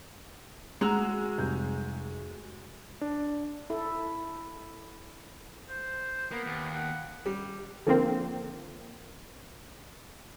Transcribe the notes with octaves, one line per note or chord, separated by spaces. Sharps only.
G#3 F#4 A#5 E6
F1 G3 G6
D4
E4 A4
C5
A#3 B3
D#2
F#5
G3
D3 F3 A#3 C4